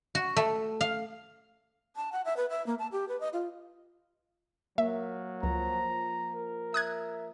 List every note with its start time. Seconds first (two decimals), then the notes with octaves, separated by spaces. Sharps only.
0.15 F#4
0.37 A3
0.81 F5
1.96 A5
2.12 F#5
2.25 E5
2.37 B4
2.50 E5
2.67 A#3
2.79 A5
2.92 G4
3.08 B4
3.20 D#5
3.33 F4
4.78 F#3 A#3 E5
5.43 C#2 F3 A#5
6.33 A#4
6.74 E5 D#6 F#6 G#6